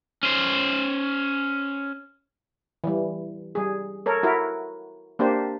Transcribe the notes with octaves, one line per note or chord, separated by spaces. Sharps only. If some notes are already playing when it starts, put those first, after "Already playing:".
C#4 C5
E3 G3
G3 G#4
A4 A#4 C#5
E4 F#4 A#4
A#3 D4 G4 C5